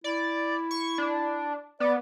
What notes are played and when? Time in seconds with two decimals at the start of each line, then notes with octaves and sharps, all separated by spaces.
0.04 E4 D5
0.71 C#6
0.98 D4
1.80 B3 D5